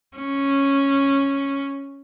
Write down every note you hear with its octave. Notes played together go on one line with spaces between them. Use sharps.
C#4